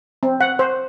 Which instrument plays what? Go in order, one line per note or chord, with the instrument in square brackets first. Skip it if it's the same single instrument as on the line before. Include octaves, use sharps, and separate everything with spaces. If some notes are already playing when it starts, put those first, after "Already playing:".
[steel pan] C4
F#5
C5